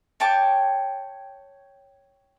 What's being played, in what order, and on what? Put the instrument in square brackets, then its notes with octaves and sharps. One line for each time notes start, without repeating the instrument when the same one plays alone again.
[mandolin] C#5 G5 A5 D6